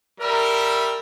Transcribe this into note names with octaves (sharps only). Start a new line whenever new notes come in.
G3 A#4 E5